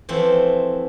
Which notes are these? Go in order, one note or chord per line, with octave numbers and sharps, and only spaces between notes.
E3 F3 A3 C4